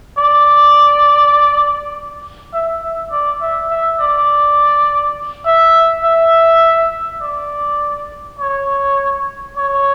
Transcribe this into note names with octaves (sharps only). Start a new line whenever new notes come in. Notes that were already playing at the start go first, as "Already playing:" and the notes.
D5
E5
E5
D5
E5
E5
D5
E5
E5
D5
C#5
C#5